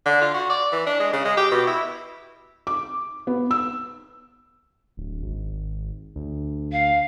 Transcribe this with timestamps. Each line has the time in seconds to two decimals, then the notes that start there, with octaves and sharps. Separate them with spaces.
0.06 D3
0.22 F4
0.34 F#4
0.50 D5
0.72 E3
0.87 D4
1.00 G#3
1.13 C#3
1.25 G#3
1.37 G4
1.51 B2
1.67 E4
2.67 D6
3.27 B3
3.51 E6
4.97 D1
5.23 G#1
6.16 D2
6.72 F5